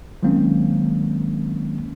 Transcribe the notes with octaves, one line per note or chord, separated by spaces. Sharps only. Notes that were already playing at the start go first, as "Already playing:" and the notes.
D#3 F#3 G#3 A#3 C4 C#4